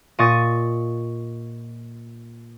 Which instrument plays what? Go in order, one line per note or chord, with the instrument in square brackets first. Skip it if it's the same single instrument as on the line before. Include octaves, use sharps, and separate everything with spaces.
[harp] A#2 D#5 C#6 A6 D#7